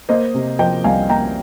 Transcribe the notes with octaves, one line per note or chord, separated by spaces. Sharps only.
A#3 C5 D#5
C3
F3 D#5 G5
C2 F5 G#5
A#3 G5 A#5